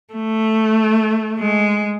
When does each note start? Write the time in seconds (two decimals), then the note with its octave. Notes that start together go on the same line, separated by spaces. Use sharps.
0.13 A3
1.39 G#3